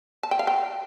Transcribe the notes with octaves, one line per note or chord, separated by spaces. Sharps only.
A5
G5
F5
G5